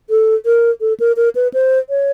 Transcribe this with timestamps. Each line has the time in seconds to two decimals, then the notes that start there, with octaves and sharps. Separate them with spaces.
0.10 A4
0.45 A#4
0.81 A4
1.00 A#4
1.17 A#4
1.35 B4
1.54 C5
1.90 C#5